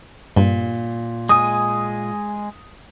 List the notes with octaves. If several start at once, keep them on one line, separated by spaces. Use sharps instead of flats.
G2 A#2
G#3 G#5 D#6